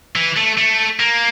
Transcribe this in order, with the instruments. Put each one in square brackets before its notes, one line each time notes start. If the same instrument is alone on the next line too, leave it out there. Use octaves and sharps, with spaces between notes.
[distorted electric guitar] E3
A3
A3
A#3